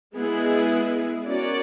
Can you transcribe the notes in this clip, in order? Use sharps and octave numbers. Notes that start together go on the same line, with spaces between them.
G#3 B3 E4 G#4
C#4 F#4 A#4 D5